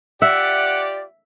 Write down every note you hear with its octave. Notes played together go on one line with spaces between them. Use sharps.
F4 G4 D5 E5 F#5